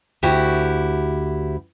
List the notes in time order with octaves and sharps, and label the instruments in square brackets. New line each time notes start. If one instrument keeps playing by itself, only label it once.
[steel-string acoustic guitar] D2 E4 F#4 G4